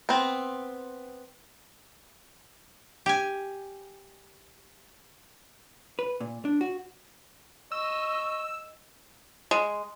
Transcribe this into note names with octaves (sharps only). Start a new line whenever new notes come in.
B3 C4
G4 G#5
B4
A#2
D4
F#4
D#5 C#6 E6
G#3